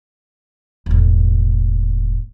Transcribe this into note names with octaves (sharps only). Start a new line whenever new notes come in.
E1 A2